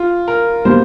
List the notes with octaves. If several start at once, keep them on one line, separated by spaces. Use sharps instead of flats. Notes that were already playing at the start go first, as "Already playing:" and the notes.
Already playing: F4
A#4
B2 G3 A#3 C5